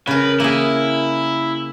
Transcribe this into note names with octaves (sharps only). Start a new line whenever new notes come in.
C#3 A#4 B4
A#3 E4 G#4